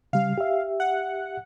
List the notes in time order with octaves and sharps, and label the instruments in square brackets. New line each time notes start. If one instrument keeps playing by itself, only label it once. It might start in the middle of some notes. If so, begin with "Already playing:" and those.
[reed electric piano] C#3 G3 [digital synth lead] F5
[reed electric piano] G4 E5
[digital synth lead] F#5